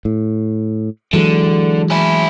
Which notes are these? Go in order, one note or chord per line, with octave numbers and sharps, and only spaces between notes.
A2
D3 E3 F#3 G#3
C#4 E4